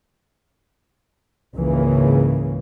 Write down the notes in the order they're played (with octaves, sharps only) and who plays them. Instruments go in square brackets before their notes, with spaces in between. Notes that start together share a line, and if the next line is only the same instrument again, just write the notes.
[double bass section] G#1 C#2 C#3 E3 A#3